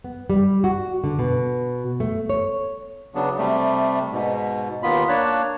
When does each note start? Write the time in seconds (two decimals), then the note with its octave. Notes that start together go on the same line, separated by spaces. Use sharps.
0.04 B3
0.30 G3
0.64 F#4
1.04 D3
1.19 B2
2.00 A3
2.30 C#5
3.15 C#3 F#3 B3 D4
3.38 C3 G3 A3
4.12 G#2 B2
4.83 D#2 A#3 B3 F4 B5
5.09 A#3 D4 C#5 A5 F#6